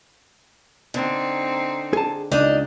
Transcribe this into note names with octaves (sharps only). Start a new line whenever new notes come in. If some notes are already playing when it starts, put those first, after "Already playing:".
D3 C4 D#4
G#4 A5
C#2 D4 D#4 D#5